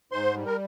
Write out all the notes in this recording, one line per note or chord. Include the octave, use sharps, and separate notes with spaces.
G#2 C5 C6
G3
A#4